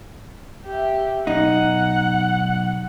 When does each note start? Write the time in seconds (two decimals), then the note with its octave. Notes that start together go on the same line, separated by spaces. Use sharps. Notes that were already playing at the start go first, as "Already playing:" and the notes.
0.65 G4 E5
1.27 B1 D#4 F#5